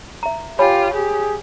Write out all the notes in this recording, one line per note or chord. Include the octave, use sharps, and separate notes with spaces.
E5 A#5
F4 G4 C#5 G#5 B5
G4 G#4